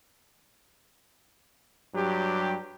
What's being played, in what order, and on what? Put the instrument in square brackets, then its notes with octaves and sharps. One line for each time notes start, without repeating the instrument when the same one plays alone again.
[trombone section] G2 F#3 G4